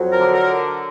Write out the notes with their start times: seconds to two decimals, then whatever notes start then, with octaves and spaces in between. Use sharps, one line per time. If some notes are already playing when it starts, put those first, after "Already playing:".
Already playing: F2 F#3
0.13 A#4
0.19 D3
0.34 A#4